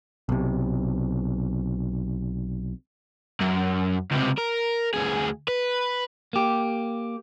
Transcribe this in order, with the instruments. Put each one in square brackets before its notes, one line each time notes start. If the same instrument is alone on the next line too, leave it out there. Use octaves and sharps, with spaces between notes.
[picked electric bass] B1 C3
[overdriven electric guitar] F#2
C#2 C3
A#4
D2 G#4
B4
[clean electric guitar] A#3 G4